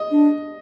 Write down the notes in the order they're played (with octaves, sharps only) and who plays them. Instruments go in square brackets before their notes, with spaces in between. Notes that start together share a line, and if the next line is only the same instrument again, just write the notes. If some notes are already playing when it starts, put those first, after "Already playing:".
Already playing: [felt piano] D#5
[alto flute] D4